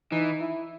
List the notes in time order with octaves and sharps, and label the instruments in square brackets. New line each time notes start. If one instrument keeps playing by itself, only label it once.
[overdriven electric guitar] E3 [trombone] D#4
[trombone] E4